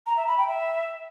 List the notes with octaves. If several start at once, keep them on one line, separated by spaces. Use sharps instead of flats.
A#5
E5
B5
G5
E5